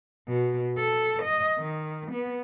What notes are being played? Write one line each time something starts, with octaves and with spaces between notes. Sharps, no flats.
B2
A4
D#5
D#3
B3